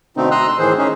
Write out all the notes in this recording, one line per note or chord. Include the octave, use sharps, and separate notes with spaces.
B2 D3 A3 C4 D#4
A#5 C6 D#6 E6 F#6
C6
A2 D#3 E3 G#4 C5
C#4 D#4 G#4